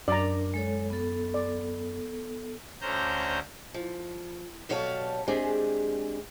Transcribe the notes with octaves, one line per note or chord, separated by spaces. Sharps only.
F#2 D4 A#4 D5 A#5
G#3 A4 C#5
B3 A4
D5
D2 D3 C#4 C5 A#5 G6
F3
B2 F#3 G3 C#5 F5 A5
G#3 C4 D4 G4 G#4